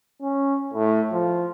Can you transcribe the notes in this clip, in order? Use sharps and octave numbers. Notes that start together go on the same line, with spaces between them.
C#4
A2
F3